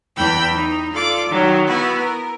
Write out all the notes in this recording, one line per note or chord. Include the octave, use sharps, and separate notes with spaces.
E2 E3 G5 B5 E6
D#4
F4 A4 D5 D6
D#3 F#3
B3 E4 F#4
A#4